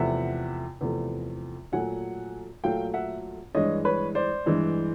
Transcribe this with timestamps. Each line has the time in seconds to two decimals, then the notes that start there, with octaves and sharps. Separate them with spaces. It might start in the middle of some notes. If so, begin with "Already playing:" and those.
Already playing: E2 C3 F3 A3 E5 F#5
0.81 E2 C3 F3 A3
1.72 A#2 F#3 A3 F#5 G#5
2.64 A#2 F#3 A3 F5 G5
2.94 E5 F#5
3.55 G2 E3 G#3 C#5 D#5
3.85 B4 C#5
4.15 C5 D5
4.46 G2 E3 G#3